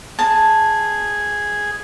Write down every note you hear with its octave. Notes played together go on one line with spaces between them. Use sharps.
G#4 A5